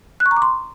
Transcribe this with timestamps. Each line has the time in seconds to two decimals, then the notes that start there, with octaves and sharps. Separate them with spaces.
0.20 F#6
0.26 C#6
0.31 A#5
0.37 D6
0.42 C6